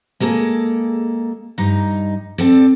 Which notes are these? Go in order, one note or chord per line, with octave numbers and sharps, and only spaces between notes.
G#3 A#3 G#4 A4
G2 D#4 A#5
C4 A4 D5